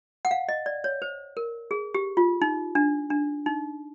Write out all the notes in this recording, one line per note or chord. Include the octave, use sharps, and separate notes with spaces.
F#5
F5
D#5
D5
C#5
C5
A#4
G#4
G4
F4
D#4
D4
D4
D#4